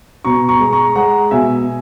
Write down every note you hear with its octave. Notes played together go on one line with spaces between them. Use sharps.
B2 A#5 C#6
A#5 C#6
G#3
A#5 C#6
G#3 F#5 A#5
B2 E5 G#5